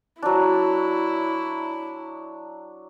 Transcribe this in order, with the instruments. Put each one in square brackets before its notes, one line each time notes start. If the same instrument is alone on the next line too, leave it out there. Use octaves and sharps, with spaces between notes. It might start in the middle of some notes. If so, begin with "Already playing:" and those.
[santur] F#3 D4 [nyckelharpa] E4